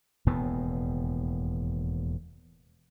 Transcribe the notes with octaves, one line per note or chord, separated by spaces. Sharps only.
E1 D#2 A2 B3